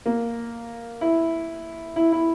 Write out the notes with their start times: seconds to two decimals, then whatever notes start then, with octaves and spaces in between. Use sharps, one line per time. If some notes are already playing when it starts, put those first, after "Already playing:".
0.06 A#3
1.01 E4
1.96 E4
2.12 E4